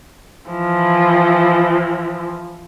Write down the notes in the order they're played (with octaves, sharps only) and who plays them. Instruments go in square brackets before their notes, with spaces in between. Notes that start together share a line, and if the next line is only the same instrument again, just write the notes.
[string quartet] E3 F3 E4